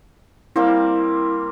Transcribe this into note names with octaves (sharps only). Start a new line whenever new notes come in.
G3 A#3 C4 E4